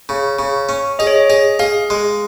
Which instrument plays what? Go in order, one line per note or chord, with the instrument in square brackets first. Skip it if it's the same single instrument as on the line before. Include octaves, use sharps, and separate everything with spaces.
[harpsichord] C#3
C#3
C#4
[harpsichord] G#4 [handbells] D#5
[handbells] C#5
D#5
[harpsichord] G#4 [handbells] D#5
[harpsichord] G#4 [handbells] F5
[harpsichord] G#3